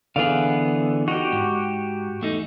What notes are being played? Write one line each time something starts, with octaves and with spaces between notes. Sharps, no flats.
D3 E3 B3 G#4 F5
D#4 F#4 G4
G#2
E2 A3 D#4